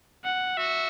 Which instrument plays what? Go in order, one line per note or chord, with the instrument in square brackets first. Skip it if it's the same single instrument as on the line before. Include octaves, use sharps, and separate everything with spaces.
[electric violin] F#5
[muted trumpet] F#4 [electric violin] E5